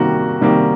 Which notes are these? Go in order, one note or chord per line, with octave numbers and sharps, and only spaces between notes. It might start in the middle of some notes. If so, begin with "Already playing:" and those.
Already playing: C3 D#3 G3 A#3 F#4
C3 D#3 G3 A#3